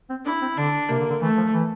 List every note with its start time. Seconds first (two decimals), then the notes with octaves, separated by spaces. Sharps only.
0.10 C4
0.25 D4 E4
0.42 C4
0.57 D3 D4
0.89 C3 A#3
1.00 D3
1.10 D3
1.22 E3 A3
1.37 F3
1.54 E3